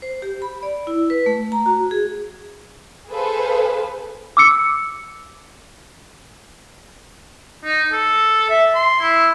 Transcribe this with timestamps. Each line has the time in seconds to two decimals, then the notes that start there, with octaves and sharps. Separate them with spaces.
0.02 C5
0.22 G4
0.42 B5
0.63 D5
0.87 E4
1.10 B4
1.26 A3
1.52 A#5
1.66 F#4
1.91 G#4
3.10 G#4 A4 B4 C5 F5
4.37 D6 E6 C#7
7.64 D#4
7.92 A4
8.50 E5
8.75 C6
9.01 E4